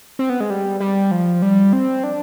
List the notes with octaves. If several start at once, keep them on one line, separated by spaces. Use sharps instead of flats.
C4
B3
G#3
G3
G3
F3
G3
C4
D4